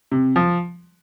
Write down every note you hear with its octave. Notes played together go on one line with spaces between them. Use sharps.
C3
F3